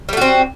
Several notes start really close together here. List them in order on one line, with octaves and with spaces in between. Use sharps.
G3 A3 F#4 C4